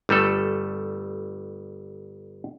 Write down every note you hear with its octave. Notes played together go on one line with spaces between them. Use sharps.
G1 G3 A3 A4